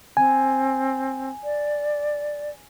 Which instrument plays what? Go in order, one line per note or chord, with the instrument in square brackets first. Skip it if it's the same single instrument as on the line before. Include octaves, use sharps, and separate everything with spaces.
[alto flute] C4 [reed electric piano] G#5
[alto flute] D5